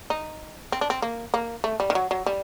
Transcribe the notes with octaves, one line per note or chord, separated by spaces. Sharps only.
D#4
C4
D4
C4
A#3
A#3
A3
G3
D#3
F#3
F#3
G3